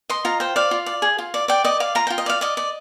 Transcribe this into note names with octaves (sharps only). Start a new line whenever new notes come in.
D#5 C6
F4 A#5
C5 G5
D5 F5
F4
D5
G#4
F4
D5
D5 G5
D5 D#5
D5 F5
F4 A#5
F4 G5
D#5
D5 F5
D5 D#5
D5